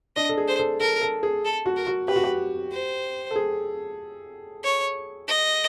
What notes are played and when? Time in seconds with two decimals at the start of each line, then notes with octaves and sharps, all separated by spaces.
0.16 D4 D#5
0.29 A4
0.37 G#4
0.48 C5
0.59 A4
0.80 A4 A#4
1.01 A4
1.23 G#4
1.45 A4
1.66 F#4
1.76 A#4
1.87 F#4
2.08 G4 B4
2.16 F#4
2.24 G4
2.72 C5
3.31 A4
3.36 G#4
4.64 C#5
5.28 D#5